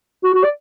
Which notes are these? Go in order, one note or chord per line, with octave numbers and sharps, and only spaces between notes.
F#4
F#4
D5